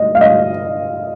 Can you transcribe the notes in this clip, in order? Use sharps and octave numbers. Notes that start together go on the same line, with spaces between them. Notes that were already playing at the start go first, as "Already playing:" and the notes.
Already playing: D#5
F5
D#5